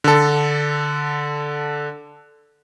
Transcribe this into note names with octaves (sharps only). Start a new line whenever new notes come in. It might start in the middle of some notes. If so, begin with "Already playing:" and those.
D3 A4